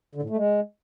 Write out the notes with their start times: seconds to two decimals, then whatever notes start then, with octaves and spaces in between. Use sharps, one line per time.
0.15 D3
0.22 A2
0.30 A3
0.37 G#3